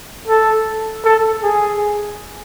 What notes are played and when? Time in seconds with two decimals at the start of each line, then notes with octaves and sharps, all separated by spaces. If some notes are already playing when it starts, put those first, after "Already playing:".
0.28 A4
1.05 A4
1.43 G#4